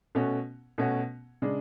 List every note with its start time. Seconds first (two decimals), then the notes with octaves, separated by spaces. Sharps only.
0.15 B2 A3 C#4 F#4
0.78 B2 A3 C#4 F#4
1.42 C#3 G#3 D4